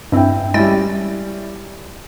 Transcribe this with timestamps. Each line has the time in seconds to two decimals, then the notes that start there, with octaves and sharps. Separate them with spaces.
0.12 G2 C4 E4 E5 G5
0.54 G3 G#3 C#4 E4 G5 A6